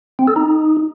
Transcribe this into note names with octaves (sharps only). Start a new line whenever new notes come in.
C4
A4
D#4